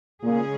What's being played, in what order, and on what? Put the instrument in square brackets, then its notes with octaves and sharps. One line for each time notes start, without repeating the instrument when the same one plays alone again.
[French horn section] A#2 [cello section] C#3 G#3 C#4 G#4